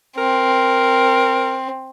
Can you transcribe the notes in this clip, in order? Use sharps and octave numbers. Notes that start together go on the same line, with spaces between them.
C4 A#4